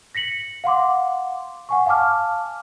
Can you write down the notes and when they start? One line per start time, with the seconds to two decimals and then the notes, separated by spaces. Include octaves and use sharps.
0.15 A#6 B6 C#7 F#7
0.64 F5 F#5 C6 D6
1.69 F#5 G#5 C#6
1.86 F5 G#5 A5 D6 F6